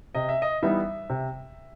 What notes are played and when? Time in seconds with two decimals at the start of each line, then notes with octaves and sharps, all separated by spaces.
0.15 C3 D#5
0.29 E5
0.42 D#5
0.62 E3 G3 B3 D#4 E5
1.10 C3